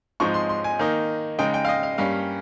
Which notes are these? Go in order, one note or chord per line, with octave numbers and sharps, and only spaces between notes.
G#2 F3 G#3 C4 D#4 C#6
C6
C6
G#5
D#3 A#3 D#4
C#3 G#3 D#4 G5
G5
F5
D#5
F5
G2 G3 A#3 C#4 F5